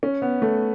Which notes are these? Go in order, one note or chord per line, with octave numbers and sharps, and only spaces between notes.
C#4
B3
A3